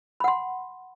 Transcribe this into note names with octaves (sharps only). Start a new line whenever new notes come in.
F#5 B5 C6